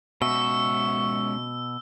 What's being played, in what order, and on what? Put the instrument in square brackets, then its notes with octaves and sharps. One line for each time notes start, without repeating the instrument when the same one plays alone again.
[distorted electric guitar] C#2 E5 [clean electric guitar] B2 [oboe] C#6 [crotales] E6